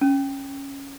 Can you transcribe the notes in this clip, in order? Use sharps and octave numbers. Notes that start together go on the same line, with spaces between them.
C#4